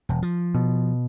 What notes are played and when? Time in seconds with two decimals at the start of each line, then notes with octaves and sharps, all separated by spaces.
0.09 E1
0.22 F3
0.54 B2